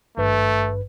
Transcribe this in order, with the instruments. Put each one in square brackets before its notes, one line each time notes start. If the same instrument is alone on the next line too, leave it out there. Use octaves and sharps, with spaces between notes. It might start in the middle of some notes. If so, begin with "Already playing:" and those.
[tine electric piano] G#1 G2 B4 [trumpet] A3